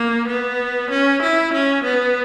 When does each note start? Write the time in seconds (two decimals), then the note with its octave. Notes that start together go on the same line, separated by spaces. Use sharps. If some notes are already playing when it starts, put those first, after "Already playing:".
Already playing: A#3
0.28 B3
0.91 C#4
1.22 E4
1.54 C#4
1.84 B3